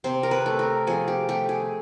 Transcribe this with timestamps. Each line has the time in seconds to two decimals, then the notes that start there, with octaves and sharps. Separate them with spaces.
0.04 C3 C5
0.23 A#4
0.31 B4
0.46 A3
0.59 A#4
0.87 F3 G#4
1.08 G4
1.29 A3 G4
1.49 G#4